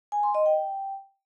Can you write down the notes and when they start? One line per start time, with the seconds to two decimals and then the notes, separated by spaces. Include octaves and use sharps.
0.12 G#5
0.23 C6
0.35 D#5
0.46 G5